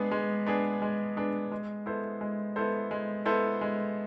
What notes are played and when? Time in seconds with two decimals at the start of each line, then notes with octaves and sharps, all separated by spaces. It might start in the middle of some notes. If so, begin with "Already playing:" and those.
Already playing: G#3 B3 D4 G#4
0.11 G#3
0.47 B3 D4 G#4
0.82 G#3
1.16 B3 D4 G#4
1.52 G#3
1.86 B3 E4 A4 C5
2.21 G#3
2.56 B3 E4 A4 C5
2.91 G#3
3.25 B3 E4 A4 C5
3.61 G#3